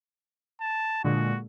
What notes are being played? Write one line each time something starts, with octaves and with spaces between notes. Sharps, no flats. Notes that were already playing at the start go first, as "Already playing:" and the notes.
A5
A#2 D3 G#3 F#4